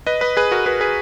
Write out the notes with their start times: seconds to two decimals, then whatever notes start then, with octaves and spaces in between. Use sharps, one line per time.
0.07 B4 D#5
0.21 B4 D#5
0.37 G#4 B4
0.51 F#4 A#4
0.66 G#4 B4
0.81 G#4 B4